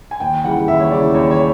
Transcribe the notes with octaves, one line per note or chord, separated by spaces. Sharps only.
G#5
D#2 G5
C#3 E3 G3 F#5
D#2 E5
C#5
C#3 E3 G3 D5
D#2 C#5
C#5